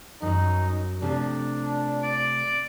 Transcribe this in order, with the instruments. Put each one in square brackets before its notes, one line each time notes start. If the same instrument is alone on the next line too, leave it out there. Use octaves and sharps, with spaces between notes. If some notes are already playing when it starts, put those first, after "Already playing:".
[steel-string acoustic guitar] F#2 F#3 [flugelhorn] D#4
[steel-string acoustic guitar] C3 F3 A3 [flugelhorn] D4
[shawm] D5